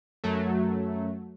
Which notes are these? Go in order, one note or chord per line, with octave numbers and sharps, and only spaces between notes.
F#2 F#3 A3